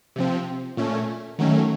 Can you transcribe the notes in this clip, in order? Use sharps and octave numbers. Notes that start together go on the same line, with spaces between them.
C3 F3 C4
A#2 A3 C#4
D#3 F#3 A3 C#4